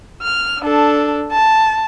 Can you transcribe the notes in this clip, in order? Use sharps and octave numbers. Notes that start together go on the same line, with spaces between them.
F6
D4 A4
A5